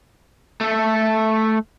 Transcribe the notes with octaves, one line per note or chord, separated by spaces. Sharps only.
A3 A4